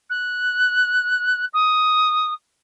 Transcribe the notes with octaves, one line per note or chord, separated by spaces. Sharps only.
F#6
D#6